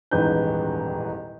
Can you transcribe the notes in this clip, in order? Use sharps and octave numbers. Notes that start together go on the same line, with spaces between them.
D#1 A1 E2 G#2 B4 G6